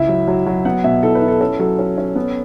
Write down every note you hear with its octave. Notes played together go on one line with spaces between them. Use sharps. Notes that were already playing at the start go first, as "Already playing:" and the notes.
Already playing: C#2 E4 E5
F#3
F#3
F#3
B3 F#5
B2 E5
E4 A4
B4
E4
A4
C#4 A4
F#3 A4
C#4
C#4
B3